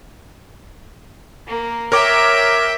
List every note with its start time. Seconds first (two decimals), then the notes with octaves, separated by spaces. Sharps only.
1.48 A#3
1.92 A#4 C#5 E5 G5 D6